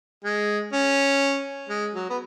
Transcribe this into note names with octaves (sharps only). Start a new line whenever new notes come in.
G#3
C#4
G#3
F#3
B3